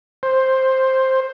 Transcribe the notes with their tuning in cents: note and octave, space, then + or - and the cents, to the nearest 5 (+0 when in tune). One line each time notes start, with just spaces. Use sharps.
C5 +5